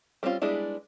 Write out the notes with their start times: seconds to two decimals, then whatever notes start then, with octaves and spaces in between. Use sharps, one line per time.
0.23 G3 C4 C#4 D#4 F4
0.42 G3 G#3 B3 D4 E4